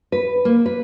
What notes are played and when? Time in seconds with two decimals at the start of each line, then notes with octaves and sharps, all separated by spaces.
0.12 B4
0.45 A#3
0.66 B4